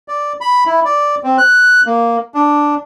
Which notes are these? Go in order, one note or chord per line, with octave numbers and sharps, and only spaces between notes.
D5
B5
E4
D5
C4
F#6
A#3
D4